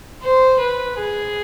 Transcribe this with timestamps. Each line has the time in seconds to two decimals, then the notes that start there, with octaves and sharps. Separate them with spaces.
0.22 C5
0.60 B4
0.99 G#4